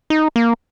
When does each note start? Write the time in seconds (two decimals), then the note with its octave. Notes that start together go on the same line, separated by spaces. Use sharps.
0.10 D#4
0.36 A#3